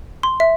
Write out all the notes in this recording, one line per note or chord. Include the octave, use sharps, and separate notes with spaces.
C6
E5